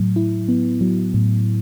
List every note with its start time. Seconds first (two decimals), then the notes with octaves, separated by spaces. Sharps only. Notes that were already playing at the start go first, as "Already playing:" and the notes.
Already playing: A2 F#3
0.16 E4
0.49 B3
0.81 F#3
1.14 A2